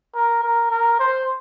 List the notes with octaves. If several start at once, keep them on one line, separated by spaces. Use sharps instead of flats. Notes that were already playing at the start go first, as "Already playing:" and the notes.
A#4
A#4
A#4
C5